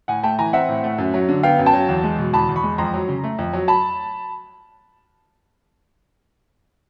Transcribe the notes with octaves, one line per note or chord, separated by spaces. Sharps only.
A2 F#5 G#5
A3 G5 A5
E3 G#5 A#5
C4 E5 F#5
A2
A3
F#2
F#3
D3
B3 F5 G5
F#2
G5 A5
F#3
E2
G#3
B2
E2 A5 B5
E2
B5 C#6
G#3
F2 A#5 C6
F#3
C#3
A3
F2
F#3
A5 B5